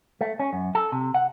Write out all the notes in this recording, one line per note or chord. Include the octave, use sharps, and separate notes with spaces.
A3
C#4
F#2
A4
C3
F#5